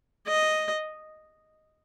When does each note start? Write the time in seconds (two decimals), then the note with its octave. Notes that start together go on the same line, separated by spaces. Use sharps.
0.27 D#5